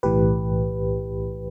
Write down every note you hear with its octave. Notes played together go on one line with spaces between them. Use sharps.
B1 A2 E3 G4 B4